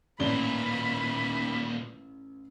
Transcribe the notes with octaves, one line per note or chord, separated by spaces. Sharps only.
A1 D#2 A#2 D4 B5 G7